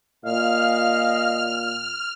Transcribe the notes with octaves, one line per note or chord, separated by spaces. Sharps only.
A#2 D#5 F5 F6